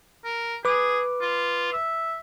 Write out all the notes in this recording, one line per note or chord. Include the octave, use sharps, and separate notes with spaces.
A#4
G#4 B4 D6
F4
E5